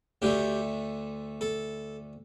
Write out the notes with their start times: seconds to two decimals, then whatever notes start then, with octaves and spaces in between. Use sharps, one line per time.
0.22 D2 D3 A3 G4
1.41 A4